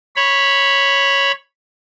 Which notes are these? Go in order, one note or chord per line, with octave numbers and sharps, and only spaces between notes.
C#5 B5